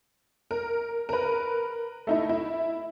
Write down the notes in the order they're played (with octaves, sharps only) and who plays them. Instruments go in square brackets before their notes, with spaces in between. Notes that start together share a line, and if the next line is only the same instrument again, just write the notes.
[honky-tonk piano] A#4
A#4 B4
A3 D#4 E4
E4